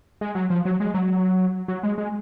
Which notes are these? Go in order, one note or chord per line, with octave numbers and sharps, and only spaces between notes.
G#3
F#3
F3
F#3
G#3
F#3
F#3
G#3
G#3